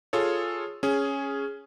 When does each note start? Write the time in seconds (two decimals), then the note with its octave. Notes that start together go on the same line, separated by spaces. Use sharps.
0.13 F4 G#4 A4 C#5
0.83 C#4 G#4